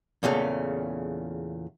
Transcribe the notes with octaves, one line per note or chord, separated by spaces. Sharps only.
E2 A#2 C#3 A3